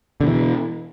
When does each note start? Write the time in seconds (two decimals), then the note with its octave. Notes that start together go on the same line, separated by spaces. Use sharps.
0.21 D3
0.24 B2
0.27 E3